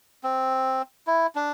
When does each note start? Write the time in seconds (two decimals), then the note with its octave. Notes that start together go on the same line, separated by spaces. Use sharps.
0.24 C4
1.07 E4
1.35 D4